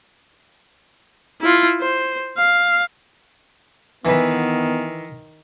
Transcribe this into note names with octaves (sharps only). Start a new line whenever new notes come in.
E4 F4
C5
F5
D#3 E3 B3 B4